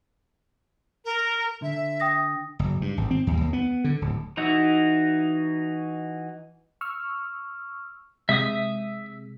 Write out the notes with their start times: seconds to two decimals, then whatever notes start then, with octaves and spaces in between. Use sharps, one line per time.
1.05 A#4
1.62 D3 E5
2.00 G5 D#6 A#6
2.59 F#1
2.81 G2
2.97 G#1
3.11 C4
3.27 D#2
3.41 D#2
3.53 B3
3.84 D3
4.01 D1
4.37 E3 D#4 E4 F#4
6.81 C#6 E6 F6
8.29 C3 G#3 E5 D#6